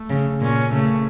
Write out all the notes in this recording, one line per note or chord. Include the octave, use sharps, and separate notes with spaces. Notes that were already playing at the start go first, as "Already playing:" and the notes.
Already playing: A3
C#3
A#2 C#4
C#3 A3